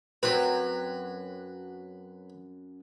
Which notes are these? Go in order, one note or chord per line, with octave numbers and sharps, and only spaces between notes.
F#2 F#3 C4 B4